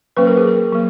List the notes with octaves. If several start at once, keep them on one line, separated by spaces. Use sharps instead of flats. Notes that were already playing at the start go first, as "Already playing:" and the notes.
F#3 A#3 C#4 B4
A#4
G#4
A#4
F#3 A#3